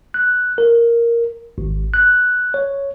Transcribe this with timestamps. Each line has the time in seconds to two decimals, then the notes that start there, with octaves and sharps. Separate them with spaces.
0.14 F#6
0.58 A#4
1.58 G#1
1.94 F#6
2.54 C#5